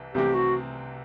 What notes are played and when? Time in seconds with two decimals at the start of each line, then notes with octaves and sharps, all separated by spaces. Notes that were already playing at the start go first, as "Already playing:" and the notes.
Already playing: C2 C3 E3
0.14 C2 C3 E3 A3 C4 G4
0.35 F#4